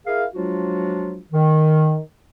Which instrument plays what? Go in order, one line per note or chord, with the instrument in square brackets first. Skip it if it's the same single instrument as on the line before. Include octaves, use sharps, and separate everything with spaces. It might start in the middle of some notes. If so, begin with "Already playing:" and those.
[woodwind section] E4 G#4 A#4 F5
F3 F#3 G#3 D4 F4 F#4
D#3